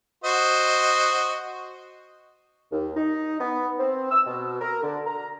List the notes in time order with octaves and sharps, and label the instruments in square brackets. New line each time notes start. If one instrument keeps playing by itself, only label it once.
[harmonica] F#4 C5 D#5
[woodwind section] D#2
D#4
B3
C4
E6
B2
A#4
D3
A#5